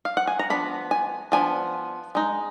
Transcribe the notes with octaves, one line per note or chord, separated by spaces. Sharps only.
F5
F#5
G#5
A#5
F3 B3 D4 B5
G#5
F3 B3 D4 G#5
G#3 D#4